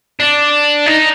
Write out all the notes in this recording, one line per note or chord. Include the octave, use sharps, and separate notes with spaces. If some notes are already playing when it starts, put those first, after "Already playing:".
D4
D#4